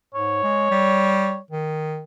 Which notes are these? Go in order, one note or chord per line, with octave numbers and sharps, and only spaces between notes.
G#2 C#5
G#3
G3
D#3